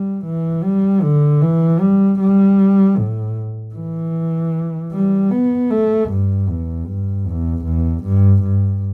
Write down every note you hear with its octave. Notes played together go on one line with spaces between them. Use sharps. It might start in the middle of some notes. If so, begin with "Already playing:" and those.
Already playing: G3
E3
G3
D3
E3
G3
G3
A2
E3
G3
B3
A3
G2
E2
G2
E2
E2
G2
G2